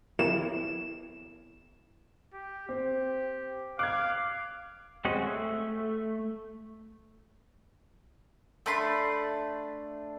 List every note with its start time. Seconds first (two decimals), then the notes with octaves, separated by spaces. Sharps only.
0.19 E7
2.34 G4
2.69 C4 G4
3.79 F5 D6 F#6 G#6
5.05 G#3 C4 C#4 F#4 G#4
5.20 A3
8.66 A3 D4 B5 C6